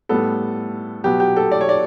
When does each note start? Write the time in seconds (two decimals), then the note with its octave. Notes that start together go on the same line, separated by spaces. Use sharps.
0.09 A2 G3 B3 A4
1.04 B2 F#3 B3 G4
1.20 G4
1.36 A4
1.52 D5
1.61 C#5
1.69 D5